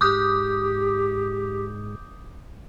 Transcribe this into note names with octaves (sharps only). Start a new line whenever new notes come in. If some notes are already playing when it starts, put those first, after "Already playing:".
G#2 G4 D6 D#6 G6